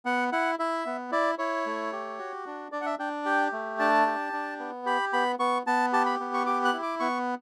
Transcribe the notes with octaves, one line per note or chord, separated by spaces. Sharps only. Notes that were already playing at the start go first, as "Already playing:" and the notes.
B3 F#5
E4 F#5
E4 E5
B3
E4 D5
E4 C#5
A3
G4
F#4
D4
D4 D5
F#5
E5
D4 G5
G4 G5
A3
D4 A5
G4
D4
B3
G4 B5
B3 B5
B3 C#6
B3 A5
G4 A5
B5
B3
C#6
G4 D6
F#6
E4
D6
B3 C#6